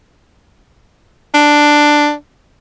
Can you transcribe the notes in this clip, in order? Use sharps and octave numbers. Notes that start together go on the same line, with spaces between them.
D4